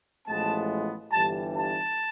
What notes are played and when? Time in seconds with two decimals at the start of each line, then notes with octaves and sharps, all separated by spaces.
0.28 A1 A2 F3 G#3 B3 A5
1.12 G1 G2 E3 G3 A5
1.54 A5